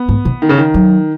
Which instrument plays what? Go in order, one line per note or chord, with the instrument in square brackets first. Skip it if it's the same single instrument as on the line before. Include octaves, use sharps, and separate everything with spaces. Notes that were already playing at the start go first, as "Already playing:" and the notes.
Already playing: [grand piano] B3
[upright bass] G#2
B2
[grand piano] D#3
C#3
D#3
[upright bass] F#3